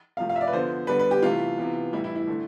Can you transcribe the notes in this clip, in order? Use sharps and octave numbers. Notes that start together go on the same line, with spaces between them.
C3 F3 A3 F5
F5
E5
D5
B4
D3 F3 B3 C5
D3 G3 B3 B4
B4
G4
C3 E3 A3 F4
C3 E3 B3
A2 E3 G3 E4
E4
E4
D3 A3